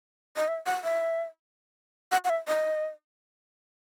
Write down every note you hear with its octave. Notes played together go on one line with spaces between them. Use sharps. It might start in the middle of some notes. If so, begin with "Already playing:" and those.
D#5
E5
F#5
E5
F#5
F#5
E5
D#5